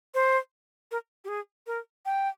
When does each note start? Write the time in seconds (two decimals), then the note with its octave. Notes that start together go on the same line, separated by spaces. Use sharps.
0.15 C5
0.91 A#4
1.25 G4
1.28 G#4
1.67 A#4
2.06 G5